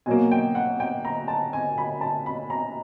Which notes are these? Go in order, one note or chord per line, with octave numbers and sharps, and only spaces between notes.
B2 F#3 A#3 G#5
G5
F#5
G5
A#5
A5
G#5
B5
A5
B5
A#5